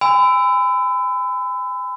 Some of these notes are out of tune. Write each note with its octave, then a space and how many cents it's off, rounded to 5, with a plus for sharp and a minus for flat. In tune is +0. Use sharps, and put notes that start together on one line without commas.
G#5 -35 B5 +40 E6 +0